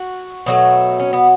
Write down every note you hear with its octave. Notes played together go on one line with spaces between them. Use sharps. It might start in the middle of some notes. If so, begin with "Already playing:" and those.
Already playing: F#4
B2 F#3 A3
C#4
B3